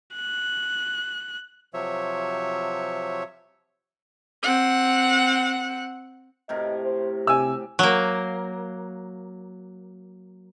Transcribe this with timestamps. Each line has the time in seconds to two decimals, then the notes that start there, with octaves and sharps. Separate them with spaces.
0.14 F#6
1.74 C3 F3 F#3 C#5 E5
4.43 C4 F#5
6.49 A2 C3 A#4 D#5
6.84 C5
7.27 C3 G4 G#5 E6
7.79 F#3 A#3